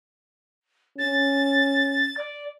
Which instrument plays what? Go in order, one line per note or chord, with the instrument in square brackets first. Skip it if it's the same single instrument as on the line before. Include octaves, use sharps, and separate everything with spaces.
[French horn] C#4 [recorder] A6
[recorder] D5